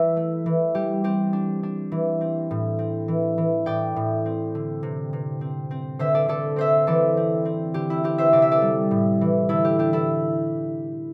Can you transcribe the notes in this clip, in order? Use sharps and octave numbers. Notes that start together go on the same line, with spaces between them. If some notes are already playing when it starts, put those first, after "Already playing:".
Already playing: E3 E5
A3
E3
G3 G4
C4 G4
D4
D4
E3
C4
A2
C4
E3
E3
A2 D5 G5
A2
C4
D3
C3
C3
C4
C4
D3 C5 E5
A4 D5
D3 A4 D5
C4 C5 E5
E3 A4 D5
C4
C4
D3 G4
E4
C4 G4
C5 E5
C3 D5
E5
A4 D5
G3
A2
E3
D3 E4 A4
G4
D4 G4
E4 A4